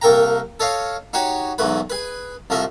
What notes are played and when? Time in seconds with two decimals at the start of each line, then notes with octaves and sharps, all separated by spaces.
0.02 C2 A#3 A4 A#4 G5 A#5
0.60 A4 C#5 D#5 F5
1.13 D#4 F#4 G4 C#5
1.58 B1 E2 G#2 A3 B4
1.90 G#4 B4
2.50 C2 F3 A3 D#5 E5